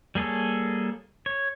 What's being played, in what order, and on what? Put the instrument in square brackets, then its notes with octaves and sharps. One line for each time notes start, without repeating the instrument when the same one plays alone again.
[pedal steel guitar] G3 A#3 G#4 A4 C#5
C#5